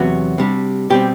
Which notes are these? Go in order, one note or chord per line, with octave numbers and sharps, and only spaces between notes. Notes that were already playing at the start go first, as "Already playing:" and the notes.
Already playing: E2 C3 F#3 B3 F#4
C3 G3 D4
B2 G3 C4 G4